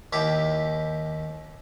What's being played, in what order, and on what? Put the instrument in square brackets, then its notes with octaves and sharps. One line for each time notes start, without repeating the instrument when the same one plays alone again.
[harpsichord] D#2 E4 G4 D6